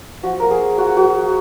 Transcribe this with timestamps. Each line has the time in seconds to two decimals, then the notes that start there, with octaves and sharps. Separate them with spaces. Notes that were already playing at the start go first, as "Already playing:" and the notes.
0.23 F3 F#4
0.40 A#3 A#4
0.51 G#4
0.60 F3
0.77 F4 F#4
0.96 F3 F#4
1.15 A#3